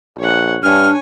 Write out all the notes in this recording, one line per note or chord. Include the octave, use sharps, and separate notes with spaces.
A#1 C#5 F#5
G2 D4 C#5 G#5 F6